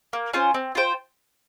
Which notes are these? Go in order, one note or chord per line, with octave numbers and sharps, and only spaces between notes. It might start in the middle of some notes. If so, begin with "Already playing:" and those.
A#3
C#4 F4 C5
C4
F4 C5 G5